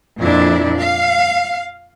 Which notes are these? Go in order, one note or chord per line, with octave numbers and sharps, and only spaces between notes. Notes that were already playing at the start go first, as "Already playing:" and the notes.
F2 A#2 D4 E4
F5